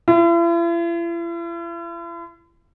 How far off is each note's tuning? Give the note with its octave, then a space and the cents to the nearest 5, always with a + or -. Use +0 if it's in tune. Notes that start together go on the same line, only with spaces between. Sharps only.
E4 +45